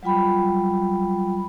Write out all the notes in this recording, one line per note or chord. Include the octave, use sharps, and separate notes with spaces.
F#3 G3 F4 G5 B5